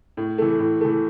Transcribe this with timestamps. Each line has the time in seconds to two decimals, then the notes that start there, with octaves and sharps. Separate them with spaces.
0.17 A2
0.38 E3 A3
0.60 A2
0.81 E3 A3